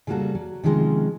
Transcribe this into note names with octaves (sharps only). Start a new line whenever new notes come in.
C#3 F#3 G3 A#3 F#4 A4
F#3
C3 D#3 F3 G#3 C#4